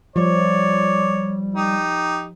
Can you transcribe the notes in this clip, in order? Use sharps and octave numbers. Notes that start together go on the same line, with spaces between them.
F3 G3 C#5 D5
D#4 G4